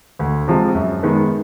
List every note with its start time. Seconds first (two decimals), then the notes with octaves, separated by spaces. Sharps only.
0.19 D2
0.48 C3 F3 G#3
0.75 F#2
1.03 D#3 G#3 B3